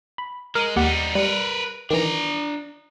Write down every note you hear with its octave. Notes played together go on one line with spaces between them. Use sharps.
B5
G#3 A#4 D#7
D#2 G3 D#4 G4 F#5
G3 A#4 B4 C#7
D#3 E3 D4 A#5